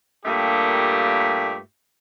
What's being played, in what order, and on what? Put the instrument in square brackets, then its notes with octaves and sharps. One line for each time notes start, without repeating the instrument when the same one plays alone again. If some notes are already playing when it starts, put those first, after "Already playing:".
[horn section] G2 A#2 A3 A#3 G4